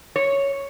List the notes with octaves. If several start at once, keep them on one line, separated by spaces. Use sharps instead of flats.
C#5